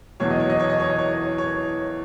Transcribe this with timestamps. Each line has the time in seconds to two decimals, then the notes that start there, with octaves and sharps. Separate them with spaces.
0.20 E2 B2 F#3 C#5
0.30 D#5
0.40 C#5
0.50 D#5
0.60 C#5
0.70 D#5
0.80 C#5
0.90 D#5
0.98 C#5
1.38 C#5